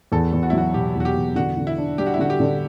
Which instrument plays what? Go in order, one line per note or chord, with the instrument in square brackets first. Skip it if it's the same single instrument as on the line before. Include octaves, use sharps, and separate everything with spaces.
[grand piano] E2 [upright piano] A4
[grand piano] E2
[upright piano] F#4
E4
[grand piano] F#3 [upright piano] F#4
[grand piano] B2 [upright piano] G4
[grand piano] E2 [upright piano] F#4
[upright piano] G4
[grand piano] E2
[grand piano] D3 [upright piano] F#4
[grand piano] D3
[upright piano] E4
[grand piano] D4
[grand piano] G3 [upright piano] G4
[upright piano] F#4
E4
[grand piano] D3 [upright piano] F#4
[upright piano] G4
[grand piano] D3